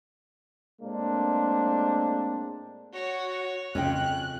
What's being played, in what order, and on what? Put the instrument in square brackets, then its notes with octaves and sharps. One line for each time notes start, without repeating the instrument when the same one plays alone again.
[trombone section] A2 G#3 A#3 C4 D4
[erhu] F#4 [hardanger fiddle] C#5
[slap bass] F2 C#3 [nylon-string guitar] C#4 D#5 G5 [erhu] F#6